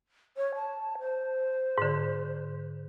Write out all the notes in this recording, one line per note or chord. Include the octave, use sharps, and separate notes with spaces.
C#5
A5
C5
G#2 D3